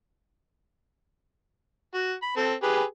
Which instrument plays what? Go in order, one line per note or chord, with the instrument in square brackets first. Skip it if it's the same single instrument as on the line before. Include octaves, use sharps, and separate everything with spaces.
[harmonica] F#4
B5
C4 A4
G4 G#4 B4